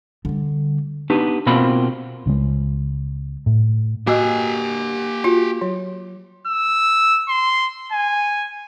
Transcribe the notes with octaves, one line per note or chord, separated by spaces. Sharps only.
D3 G3
B3 D4 D#4 G4 B4
B2 A#3 C4 F4 F#4 B5
C#2 C#3 G3 G#3
A2
A#3 F#4 G4 D#5 G#5 E6 F#6
F4 F#4
F#3
E6
C6
G#5